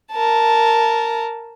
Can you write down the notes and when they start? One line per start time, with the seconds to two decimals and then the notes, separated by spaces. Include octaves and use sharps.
0.12 A#4 A5